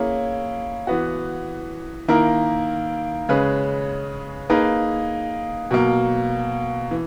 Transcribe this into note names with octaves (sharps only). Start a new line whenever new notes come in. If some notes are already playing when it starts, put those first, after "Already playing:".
Already playing: A#3 C#4 E4 G#4
E3 B3 F#4
D#3 A#3 E4 A#4
C#3 G#3 C#4 G#4 B4
A#3 D#4 G#4 B4
B2 F#3 A#3
E3